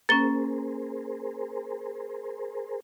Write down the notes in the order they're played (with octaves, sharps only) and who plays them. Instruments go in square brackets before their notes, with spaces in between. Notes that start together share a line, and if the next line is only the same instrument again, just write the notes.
[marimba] A#3 C#4 [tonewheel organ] G#4 A#4 C5 [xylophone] A6 G7